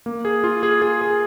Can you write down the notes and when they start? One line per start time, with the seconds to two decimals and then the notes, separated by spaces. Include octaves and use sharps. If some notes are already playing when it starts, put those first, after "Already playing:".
0.06 A#3
0.25 G#4
0.44 F4
0.63 G#4
0.82 G#4
1.01 G#4